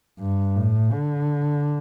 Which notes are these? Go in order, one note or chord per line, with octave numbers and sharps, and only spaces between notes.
G2
A2
D3